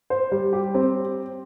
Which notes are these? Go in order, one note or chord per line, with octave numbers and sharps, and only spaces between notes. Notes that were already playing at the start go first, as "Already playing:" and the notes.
C5
G3
G4
C4